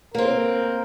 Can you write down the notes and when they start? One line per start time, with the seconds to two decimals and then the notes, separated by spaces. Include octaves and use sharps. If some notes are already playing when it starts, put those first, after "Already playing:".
0.15 A#3 C4 A#4